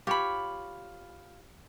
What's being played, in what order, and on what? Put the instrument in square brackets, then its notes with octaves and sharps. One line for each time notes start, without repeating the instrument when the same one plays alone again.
[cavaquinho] F4 B5 [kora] G4 C#5